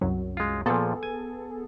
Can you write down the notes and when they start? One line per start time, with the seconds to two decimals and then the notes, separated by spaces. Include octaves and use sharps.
0.01 C2 F#2 F#3
0.37 G#3 F4
0.66 A#2 F3 B3 G#4 A4
1.03 G#5